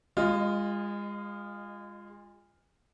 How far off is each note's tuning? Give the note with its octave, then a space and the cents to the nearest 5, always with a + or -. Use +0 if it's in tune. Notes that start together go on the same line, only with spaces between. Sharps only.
G#3 -30 F4 +0 D#5 -5